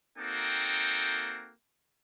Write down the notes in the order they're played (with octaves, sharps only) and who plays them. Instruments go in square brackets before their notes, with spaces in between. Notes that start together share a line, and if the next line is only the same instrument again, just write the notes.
[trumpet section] A#3 C4 D#4 F#4 A4 G5